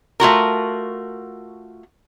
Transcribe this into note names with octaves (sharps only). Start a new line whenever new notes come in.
A3 F4 F#4 A#4